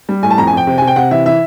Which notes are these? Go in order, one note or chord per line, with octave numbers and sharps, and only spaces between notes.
G3
A2 G#5
A5
F2 A#5
G#5
F2
G5
C3
C3 G#5
G5
C3 F#5
E3 E5
E3 E5